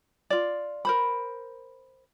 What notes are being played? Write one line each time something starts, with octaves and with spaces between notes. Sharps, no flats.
F4 D5
A#4 C5 B5